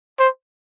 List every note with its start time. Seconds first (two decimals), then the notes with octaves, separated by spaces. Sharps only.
0.19 C5